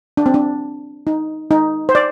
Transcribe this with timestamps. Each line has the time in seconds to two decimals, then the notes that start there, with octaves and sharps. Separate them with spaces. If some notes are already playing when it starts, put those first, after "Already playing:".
0.17 D4
0.26 C4
0.34 D4
1.07 D#4
1.51 D#4
1.89 C5
1.95 D5